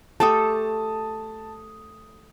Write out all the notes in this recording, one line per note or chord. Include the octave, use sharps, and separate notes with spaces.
A3 G4 A4 A5 D#6